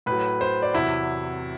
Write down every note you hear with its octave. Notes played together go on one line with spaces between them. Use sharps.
A2 F#3 B4
C5
D5
E2 C3 F#3 E4